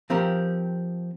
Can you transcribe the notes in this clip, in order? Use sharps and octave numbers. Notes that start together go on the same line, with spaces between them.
F3 C4 G4 A#4